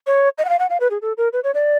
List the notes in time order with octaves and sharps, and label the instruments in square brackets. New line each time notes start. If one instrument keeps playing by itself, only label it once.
[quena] C#5
D#5
F#5
F5
F#5
F5
B4
G#4
A4
A#4
B4
C#5
D5